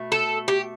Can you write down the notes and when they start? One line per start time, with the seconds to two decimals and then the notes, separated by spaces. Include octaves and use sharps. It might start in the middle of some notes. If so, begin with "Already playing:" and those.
Already playing: B2 A3
0.12 A4
0.48 G4